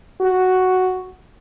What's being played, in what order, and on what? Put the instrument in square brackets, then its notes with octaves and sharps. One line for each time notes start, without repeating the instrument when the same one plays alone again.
[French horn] F#4